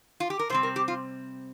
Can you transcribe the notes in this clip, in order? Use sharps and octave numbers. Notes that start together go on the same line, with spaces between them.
F4
G4
A#4
C3 G3 C4 C5
A#4
G4
F4